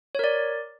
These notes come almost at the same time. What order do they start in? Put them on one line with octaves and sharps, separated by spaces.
C#5 A#4 D5